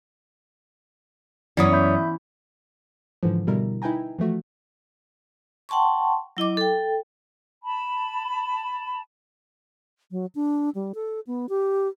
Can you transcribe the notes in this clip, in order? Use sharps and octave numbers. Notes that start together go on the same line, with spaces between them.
F#2 E3 B3 C#4 C#5 D5 D#6
E5 B5 G6
G#2 D3 E3 F3
B2 D3 G3 E4 A#4
D#4 E4 B4 G5 G#5 A#5
E3 F3 A3 F#4
F#5 G5 A5 C6 C#6
F#3 E4 D#5 D6
A4 G5
A5 B5
F#3
D4
G3
A4
B3
G4